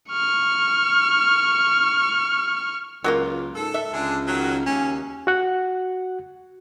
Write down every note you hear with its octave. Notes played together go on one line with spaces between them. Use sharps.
C#6 F6
C#2 F#3 A#3 F4
G#2 A4
E5
C#2 D3 G#3 D4
D#3 F#3
D#2 C#4
F#4 F#5